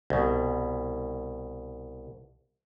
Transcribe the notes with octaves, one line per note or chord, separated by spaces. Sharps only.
C2 B2